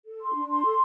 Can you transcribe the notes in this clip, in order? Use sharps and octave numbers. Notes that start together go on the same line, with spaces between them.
A4
C6
D4
C6
A4